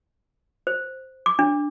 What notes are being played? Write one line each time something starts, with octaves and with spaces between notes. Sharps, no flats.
C5
D6
D4